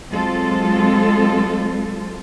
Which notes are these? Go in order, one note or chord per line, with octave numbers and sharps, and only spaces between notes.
F#3 G#3 C4 F4 A4